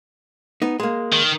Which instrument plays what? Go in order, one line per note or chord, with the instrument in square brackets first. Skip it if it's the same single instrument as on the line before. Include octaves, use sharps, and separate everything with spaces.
[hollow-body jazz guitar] B3 D#4
G#3 A#3
[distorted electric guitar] D#3